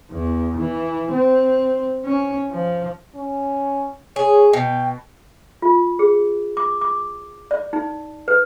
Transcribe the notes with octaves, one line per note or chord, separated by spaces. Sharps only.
E2
E3
C4
C#4
F3
C#4
G#4 C#5
B2 G5
F4
G#4
D6
D6
D5
D#4
B4